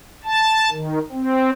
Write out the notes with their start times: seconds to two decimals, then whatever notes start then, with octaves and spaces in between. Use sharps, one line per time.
0.25 A5
0.71 D#3
1.12 C4